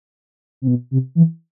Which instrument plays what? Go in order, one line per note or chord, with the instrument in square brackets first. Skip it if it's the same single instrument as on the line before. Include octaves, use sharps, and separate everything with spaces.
[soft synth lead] C3
B2
C3
E3